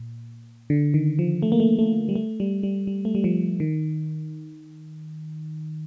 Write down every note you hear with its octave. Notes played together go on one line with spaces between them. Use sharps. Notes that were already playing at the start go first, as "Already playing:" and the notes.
Already playing: A#2
D3
D#3
F3
A3
A#3
A3
A3
G3
A3
G3
G3
G3
A3
G3
F3
D#3